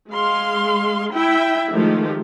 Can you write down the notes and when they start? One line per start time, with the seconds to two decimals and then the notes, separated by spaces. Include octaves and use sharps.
0.10 G#3 F5 C6
1.13 E4 E5 G5
1.73 D#3 F3 G#3 A3 G4